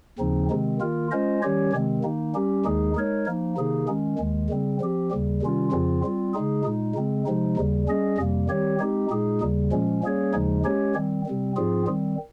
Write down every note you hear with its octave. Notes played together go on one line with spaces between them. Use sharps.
D#2 C#3 F3 C4 D#4
C3 D#3 G#3 C4
D#3 A#3 F4 A#4
G#3 C#4 F4 C5 D#5
D#3 G3 C#4 G4 C#5
C3 D#3 G#3 C4
D#3 A#3 D#4
G3 C#4 G4
D#2 D#3 G#3 D#4 G#4
G#3 D#4 A#4 C#5
F3 A#3 D#4
C3 D#3 A#3 D#4 G#4
D#3 G#3 C#4
D#2 D#3 G#3
C#3 G3 C4
F3 C4 G4
D#2 C#3 G3
C3 D#3 G3 C#4 F4
F2 C#3 F3 C4 F4
G3 C4 F4
C#3 G#3 D#4 G#4
A#2 G#3 D#4
C#3 G#3 C4
C3 F3 G#3 D#4
D#2 C#3 G3
G3 C#4 G#4 D#5
F2 C3 G3 A#3
D#3 G3 C4 G4 C#5
G#3 C4 D#4 G4
A#2 G#3 D#4 G#4
D#2 C#3 G3
A#2 F3 G#3 C#4
G3 A#3 C#4 G#4 C#5
D#2 C#3 F3 G#3 D#4
G#3 C#4 G4 C#5
D#3 G3 C4
C3 G3 C4
G#2 F3 C4 F4 G#4
D#3 G3 C4